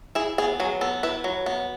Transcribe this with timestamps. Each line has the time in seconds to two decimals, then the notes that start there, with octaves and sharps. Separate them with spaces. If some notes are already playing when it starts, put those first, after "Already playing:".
0.15 E4 G#4
0.38 B3 G#4
0.60 F#3 G#4
0.81 B3 A4
1.03 E4 B4
1.24 F#3
1.46 B3